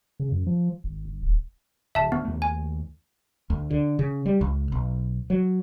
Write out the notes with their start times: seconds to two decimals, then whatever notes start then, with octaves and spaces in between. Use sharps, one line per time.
0.20 C#3
0.32 F#2
0.47 F3
0.84 G#1
1.05 G1
1.23 D#1
1.95 D1 E5 A5
2.12 D2 B3
2.25 D#2 A3
2.42 G#5
3.50 D2
3.71 D3
3.99 C#3
4.26 G3
4.41 C#2
4.72 B1
5.30 F#3